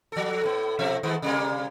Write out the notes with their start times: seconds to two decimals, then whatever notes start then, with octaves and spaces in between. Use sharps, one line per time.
0.12 F3 A4
0.43 A2 B3
0.79 B2 F3 E5
1.03 D#3 G#3 B3
1.22 C3 G3 A#3